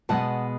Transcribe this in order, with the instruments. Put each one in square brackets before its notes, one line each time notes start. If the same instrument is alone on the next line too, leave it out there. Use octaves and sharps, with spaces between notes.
[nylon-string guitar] B2 G#3 B3 F#5 A5